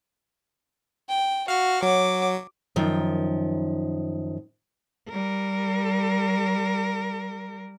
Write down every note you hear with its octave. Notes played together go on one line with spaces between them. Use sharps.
G5
F#4 F5 F6
F#3 C#5 F#5 D6
F#2 D#3 F3
G3 A#4